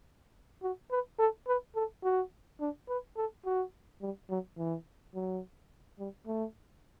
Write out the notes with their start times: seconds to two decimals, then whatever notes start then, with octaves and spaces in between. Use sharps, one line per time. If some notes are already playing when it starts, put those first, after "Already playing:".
0.63 F#4
0.91 B4
1.19 A4
1.47 B4
1.76 A4
2.04 F#4
2.60 D4
2.89 B4
3.17 A4
3.46 F#4
4.02 G3
4.30 F#3
4.58 E3
5.15 F#3
5.99 G3
6.27 A3